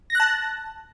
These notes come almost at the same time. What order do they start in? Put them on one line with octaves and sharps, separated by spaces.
A#6 F#6 A5